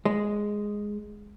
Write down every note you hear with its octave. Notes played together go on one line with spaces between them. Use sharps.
G#3